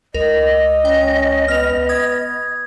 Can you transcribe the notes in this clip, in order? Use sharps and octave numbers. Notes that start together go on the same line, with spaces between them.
C#2 A#4 D#5
C#4 G5
B3 F6 F7
D#6 G#6